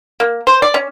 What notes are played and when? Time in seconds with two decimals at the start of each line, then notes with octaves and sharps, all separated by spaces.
0.20 A#3
0.47 C5
0.62 D5
0.74 C#4